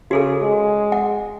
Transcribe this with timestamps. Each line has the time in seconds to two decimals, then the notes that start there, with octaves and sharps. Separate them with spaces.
0.11 C#3 F#4 G#4 A4
0.42 G#3
0.92 F#5